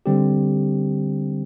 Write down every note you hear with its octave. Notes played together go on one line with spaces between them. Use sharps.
D3 G3 C4 G4